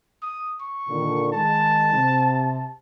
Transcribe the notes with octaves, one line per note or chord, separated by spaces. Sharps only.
D#6
C#6
A#2 D3 D#3
D#3 G#3 A5
C3